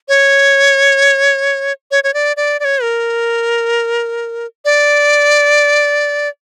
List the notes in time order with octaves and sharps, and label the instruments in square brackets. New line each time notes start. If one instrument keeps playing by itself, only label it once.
[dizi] C#5
C#5
C#5
D5
D5
D5
C#5
A#4
D5